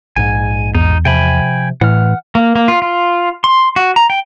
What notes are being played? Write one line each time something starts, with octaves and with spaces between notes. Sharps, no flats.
A#1 G#2 G#5
E2 D#4
C3 F3 G5 G#5 B5
A2 E3 F#5 F6
A#3
A#3
F4
F4
C6
F#4
A#5
G5